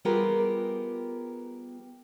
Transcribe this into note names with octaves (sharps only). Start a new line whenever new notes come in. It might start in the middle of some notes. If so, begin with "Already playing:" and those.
G3 B3 F4 G4 G#4 A#4